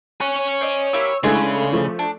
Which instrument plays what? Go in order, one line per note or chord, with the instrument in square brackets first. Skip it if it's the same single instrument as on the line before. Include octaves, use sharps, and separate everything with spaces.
[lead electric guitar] C#5 G#5 [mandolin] F#6
[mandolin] C5 D5 D#5
[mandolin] A#3 E4 G4 [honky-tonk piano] E6
[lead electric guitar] C#3 [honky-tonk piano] G#3 A3 E4 [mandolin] D4 G#4 B4
[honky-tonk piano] F3 A3
[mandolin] D4